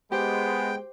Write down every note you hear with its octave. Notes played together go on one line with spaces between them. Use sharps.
G#3 B3 G4 C5 G5